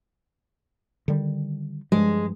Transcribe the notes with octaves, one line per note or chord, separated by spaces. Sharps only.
D3 D#3 G3
G2 F3 G#3